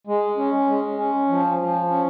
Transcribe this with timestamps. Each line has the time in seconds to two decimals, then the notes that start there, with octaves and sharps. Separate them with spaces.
0.07 G#3
0.37 C#4
0.67 G#3
0.98 C#4
1.28 F3
1.59 F3
1.89 C#4